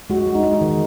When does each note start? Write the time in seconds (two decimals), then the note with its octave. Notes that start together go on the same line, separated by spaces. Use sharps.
0.10 G#3 F#4
0.27 G#3
0.35 D#4
0.44 G#3
0.61 D#3